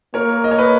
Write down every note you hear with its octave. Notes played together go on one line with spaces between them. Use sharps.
A#3 A#4 C#5
D#5
C#5
B4 D#5